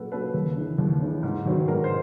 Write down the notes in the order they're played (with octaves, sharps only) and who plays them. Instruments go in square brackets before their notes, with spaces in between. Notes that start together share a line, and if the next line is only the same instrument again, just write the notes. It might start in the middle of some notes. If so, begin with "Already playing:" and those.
Already playing: [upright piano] A#2 F#3 A#3 C#4 A4 B4 F#5
F#3 A#3 C#4 A4 B4
D#2
C#3 E3
D#2
C#3 E3
G#2
D#3 F#3 B3
G#2 A#4
C5